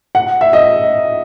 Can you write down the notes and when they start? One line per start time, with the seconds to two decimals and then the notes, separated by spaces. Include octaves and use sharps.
0.15 F#5
0.41 E5
0.53 D#5